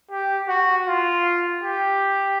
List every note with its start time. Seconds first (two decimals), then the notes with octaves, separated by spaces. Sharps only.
0.11 G4
0.48 F#4
0.87 F4
1.63 G4